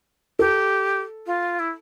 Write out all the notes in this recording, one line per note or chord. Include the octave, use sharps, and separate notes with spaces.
G4 A4
F4
E4